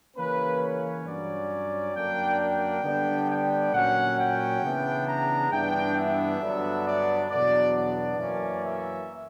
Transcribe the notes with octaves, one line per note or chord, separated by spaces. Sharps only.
C#3 E3 A#3 C#4 B4
C#5
G2 F#3 C#4 D5
F#2 D3 A#3 D4 G5
G5
D3 G3 B3 D4
G5
A#2 F#3 C#4 F#5
G5
C#3 E3 B3 D4
A#5
G2 E3 B3 D4 G5
E5
G2 D3 F#3 B3 D4
D5
E2 B2 F#3 B3 D4 D5
D5
F#2 E3 A#3 C#4
E5